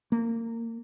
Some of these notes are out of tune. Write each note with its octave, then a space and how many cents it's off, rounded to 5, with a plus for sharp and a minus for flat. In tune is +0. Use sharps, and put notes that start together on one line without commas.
A#3 -25